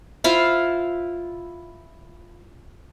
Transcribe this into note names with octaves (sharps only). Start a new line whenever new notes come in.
E4 F4 C5 F5